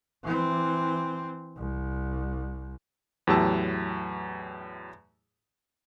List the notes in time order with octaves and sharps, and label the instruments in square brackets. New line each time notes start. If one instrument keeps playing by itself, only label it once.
[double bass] E3 C4
C2
[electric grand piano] E2 A2 F#3 G4 A5 E6